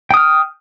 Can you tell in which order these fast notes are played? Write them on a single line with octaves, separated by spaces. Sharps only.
G5 D#6 F6